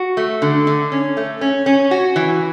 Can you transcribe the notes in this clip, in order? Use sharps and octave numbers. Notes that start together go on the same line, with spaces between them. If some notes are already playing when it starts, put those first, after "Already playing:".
Already playing: F#4
A3
D3
D3
C#4
A3
C#4
C#4
F#4
E3